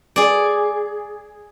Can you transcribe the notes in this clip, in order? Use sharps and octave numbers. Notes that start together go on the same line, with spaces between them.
G#4 D5